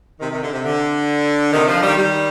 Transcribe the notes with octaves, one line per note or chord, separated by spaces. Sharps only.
C3 D#3
C3 D#3
D3
C3
D3
C3 D#3
D3 F3
D#3 G3
D#3 G3